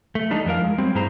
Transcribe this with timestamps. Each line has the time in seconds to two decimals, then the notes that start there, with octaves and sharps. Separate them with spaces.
0.15 A3
0.30 E3 G3 D4 D#4
0.45 F2 E3 F3 A#4 F5
0.62 G#3
0.78 F#3 G3 C4
0.95 G2 E4 G#4 C5 A#5